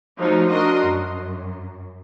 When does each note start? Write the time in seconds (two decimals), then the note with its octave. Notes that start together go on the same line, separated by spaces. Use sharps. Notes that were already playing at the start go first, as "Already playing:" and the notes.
0.18 F3 F#3 A3 D#4
0.49 D4 F#4 A#4 D#5 C6
0.83 F#2